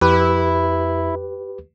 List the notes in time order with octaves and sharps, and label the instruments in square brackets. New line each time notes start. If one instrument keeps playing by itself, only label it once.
[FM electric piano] F2 [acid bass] E4 [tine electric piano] G4 B4